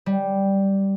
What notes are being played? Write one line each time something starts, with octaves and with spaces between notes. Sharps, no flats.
G3